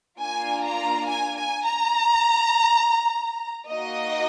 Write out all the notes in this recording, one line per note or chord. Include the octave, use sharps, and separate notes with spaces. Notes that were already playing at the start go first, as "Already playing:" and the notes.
A#3 D4 F4 G#5
A#5
G#5
G#5
A#5
A#3 D#4 F#4 D#5